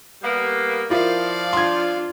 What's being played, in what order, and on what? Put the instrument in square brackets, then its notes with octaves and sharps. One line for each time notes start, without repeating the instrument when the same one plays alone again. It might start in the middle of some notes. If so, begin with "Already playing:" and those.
[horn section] G3 A#3 B3
[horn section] F3 [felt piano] E4 F4 A#4 [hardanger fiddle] D5 F5
[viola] D4 F4 [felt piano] C6 G#6